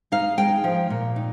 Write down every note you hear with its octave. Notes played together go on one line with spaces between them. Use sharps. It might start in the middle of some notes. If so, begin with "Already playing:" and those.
D#4 F5
G#3 G5
F3
A#2
D#4